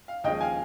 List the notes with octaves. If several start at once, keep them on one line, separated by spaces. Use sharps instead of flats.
F5
D#2 C#3 F3 G#3 D#5 G5
F5 G#5